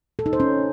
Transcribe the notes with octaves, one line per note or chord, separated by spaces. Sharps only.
A4
D#4
C5
C#4